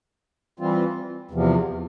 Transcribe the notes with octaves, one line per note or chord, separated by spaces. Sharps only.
E3 G3 C4 F4
E2 C3 F3